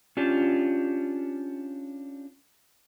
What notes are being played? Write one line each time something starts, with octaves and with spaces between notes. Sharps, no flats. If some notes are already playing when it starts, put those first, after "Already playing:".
C#4 D4 F4 G4